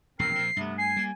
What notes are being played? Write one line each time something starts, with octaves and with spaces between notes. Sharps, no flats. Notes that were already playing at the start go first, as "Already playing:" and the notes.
E1 A#1 G2 C4 A#4 C7
A#2 F3
G2 C3 A3 B3
G#5 C7
G3 A#3